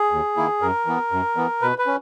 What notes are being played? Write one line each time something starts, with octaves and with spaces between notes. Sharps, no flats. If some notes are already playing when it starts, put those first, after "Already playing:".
Already playing: G#4
D#2
D#3 A#3 E4
F#2 A#4
E3 B3
F#2
E3 B3
B2 B4
B4
C#4